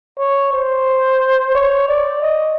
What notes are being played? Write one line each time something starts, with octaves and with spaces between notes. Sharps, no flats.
C#5
C5
C#5
D5
D#5